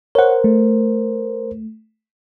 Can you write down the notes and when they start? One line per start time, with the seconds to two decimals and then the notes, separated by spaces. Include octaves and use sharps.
0.15 A#4 C5 C#5 F#5
0.44 A3